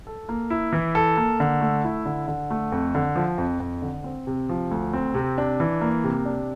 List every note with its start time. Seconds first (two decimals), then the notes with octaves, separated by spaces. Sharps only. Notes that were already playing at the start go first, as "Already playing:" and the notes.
0.07 A4
0.29 A#3
0.50 E4
0.73 E3
0.95 A4
1.17 A#3
1.40 D3
1.61 A3
1.84 E4
2.06 D3
2.28 D3
2.50 A3
2.72 F2
2.95 D3
3.16 F3
3.38 F2
3.60 F2
3.82 D3
4.04 C4
4.27 C3
4.49 F3
4.71 D2
4.93 C4
5.15 C3
5.38 D4
5.60 E3
5.81 A#3
6.04 C3
6.25 D4